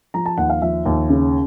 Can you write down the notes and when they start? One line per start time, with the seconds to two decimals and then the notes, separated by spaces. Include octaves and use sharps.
0.14 F3 A#5
0.26 A5
0.38 D#2 F#5
0.50 F5
0.62 F3 E5
0.86 D#2
1.10 C#3